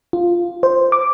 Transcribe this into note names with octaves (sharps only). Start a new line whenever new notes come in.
F4
C5
D6